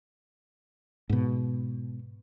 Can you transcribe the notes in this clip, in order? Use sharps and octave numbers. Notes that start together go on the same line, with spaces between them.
G#2 B2